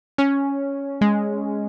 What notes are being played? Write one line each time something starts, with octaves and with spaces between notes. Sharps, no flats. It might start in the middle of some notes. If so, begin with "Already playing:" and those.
C#4
G#3